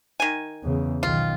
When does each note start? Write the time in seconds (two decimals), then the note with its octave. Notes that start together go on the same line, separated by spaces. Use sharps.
0.20 D#3 G#5
0.64 E2 C#3
1.03 B1 D#3 F4